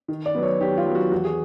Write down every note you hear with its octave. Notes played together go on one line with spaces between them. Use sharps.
D#3
D5
F#3 B3
C#5
D#3 G4
F4
F#3 B3
F#4
E2 F#4
G#4